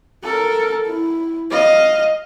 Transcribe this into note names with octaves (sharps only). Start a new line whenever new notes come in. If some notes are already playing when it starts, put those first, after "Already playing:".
A4 A#4
E4
D#5 F5